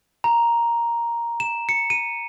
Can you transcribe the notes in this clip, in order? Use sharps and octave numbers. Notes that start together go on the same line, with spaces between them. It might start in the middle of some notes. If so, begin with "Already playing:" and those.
A#5
E7
C#7
D#7